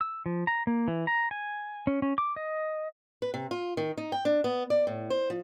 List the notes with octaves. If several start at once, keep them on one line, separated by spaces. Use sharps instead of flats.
E6
F3
A#5
A#3
E3
A#5
G#5
C#4
C#4
D6
D#5
B4
C3
F4
D#3
D#4
G5
D4
B3
D5
A2
C5
F3